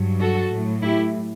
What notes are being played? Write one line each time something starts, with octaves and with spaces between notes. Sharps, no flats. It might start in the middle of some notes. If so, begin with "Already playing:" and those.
Already playing: G2 F#3
F#4 A4
A2 F#3
E4 G4